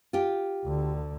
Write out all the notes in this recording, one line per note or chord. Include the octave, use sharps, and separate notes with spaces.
F4 G4
D2 D3